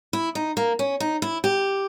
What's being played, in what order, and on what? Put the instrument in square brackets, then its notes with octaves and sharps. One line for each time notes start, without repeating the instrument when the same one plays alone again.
[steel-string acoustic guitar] E4
D#4
A#3
C#4
D#4
E4
G4